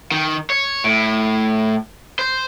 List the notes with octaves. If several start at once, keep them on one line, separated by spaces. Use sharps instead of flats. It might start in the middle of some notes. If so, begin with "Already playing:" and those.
D#3
C#5
A2
C5